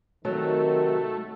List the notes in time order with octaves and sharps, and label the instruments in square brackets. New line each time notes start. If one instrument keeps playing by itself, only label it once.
[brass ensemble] C3 D#3 [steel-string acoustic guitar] F#3 [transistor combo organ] A3